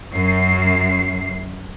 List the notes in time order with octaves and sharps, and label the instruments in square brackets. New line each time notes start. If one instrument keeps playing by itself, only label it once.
[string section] F#2 C7